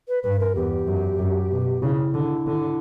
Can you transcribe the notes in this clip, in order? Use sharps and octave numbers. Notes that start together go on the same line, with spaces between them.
B4
G2 B4
A#4
E2 G4
F#2
F#2
B2
C#3 E4
D3
D3